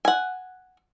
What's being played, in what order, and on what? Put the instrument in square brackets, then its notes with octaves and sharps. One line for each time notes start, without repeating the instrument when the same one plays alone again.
[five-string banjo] F#5 G#5